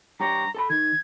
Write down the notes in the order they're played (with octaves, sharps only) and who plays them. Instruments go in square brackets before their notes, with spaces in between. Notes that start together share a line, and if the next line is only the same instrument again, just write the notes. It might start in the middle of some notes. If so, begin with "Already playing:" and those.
[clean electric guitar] G2 G4 C#5 [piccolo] A#5
[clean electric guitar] A4 A5 B5
[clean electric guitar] D#3 [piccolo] G#6